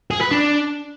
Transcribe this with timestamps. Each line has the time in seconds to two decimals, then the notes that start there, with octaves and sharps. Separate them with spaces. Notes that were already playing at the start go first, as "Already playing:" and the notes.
0.11 G#4
0.21 B4
0.31 D4